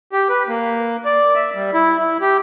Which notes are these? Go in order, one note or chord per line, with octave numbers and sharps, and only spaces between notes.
G4
B4
A#3
D5
E5
G3
E4
E4
G4